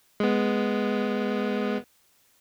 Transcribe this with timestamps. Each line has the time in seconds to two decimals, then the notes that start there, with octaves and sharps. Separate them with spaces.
0.20 G#3 B3